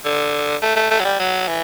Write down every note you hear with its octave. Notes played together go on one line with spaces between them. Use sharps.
D3
A3
A3
A3
F#3
G3
F#3
E3